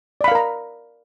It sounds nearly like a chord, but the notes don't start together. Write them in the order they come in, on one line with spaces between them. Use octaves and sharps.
D5 B5 F5 A#4 A#5